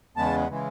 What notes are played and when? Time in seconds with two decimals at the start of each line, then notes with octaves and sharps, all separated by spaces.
0.17 E2 C#3 G#3 B3 A5
0.49 C#3 E3 G#3